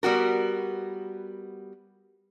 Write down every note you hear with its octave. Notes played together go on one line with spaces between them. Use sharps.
G3 B3 F#4 A#4